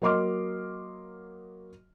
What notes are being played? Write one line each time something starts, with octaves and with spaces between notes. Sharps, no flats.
F#3 A#3 D#5 C6 D6 F6